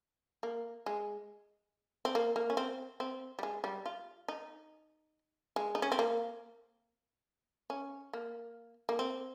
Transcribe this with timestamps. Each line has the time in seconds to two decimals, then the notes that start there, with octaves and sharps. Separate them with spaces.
0.43 A#3
0.86 G#3
2.05 C4
2.15 A#3
2.36 A#3
2.50 C#4
2.57 C4
3.00 C4
3.39 G3
3.43 G#3
3.64 G3
3.86 F4
4.28 D#4
5.56 G#3
5.75 D#4
5.82 C#4
5.92 C4
5.99 A#3
7.70 C#4
8.13 A#3
8.89 A#3
8.99 C4